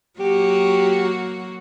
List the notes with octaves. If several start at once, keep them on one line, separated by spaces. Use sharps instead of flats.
F#3 A#3 F#4 G4